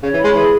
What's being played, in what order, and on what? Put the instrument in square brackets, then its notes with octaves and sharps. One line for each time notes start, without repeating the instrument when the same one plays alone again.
[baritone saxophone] C#3 [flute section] C#5
[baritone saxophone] E3
[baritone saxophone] G#3 [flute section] B5
[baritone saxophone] E3 [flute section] G#4